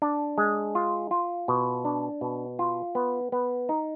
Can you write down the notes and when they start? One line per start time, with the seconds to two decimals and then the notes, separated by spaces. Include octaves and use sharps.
0.02 D4
0.38 G#3
0.75 F4
1.11 F4
1.48 B2
1.85 D4
2.21 B2
2.59 F4
2.95 B3
3.32 B3
3.69 D#4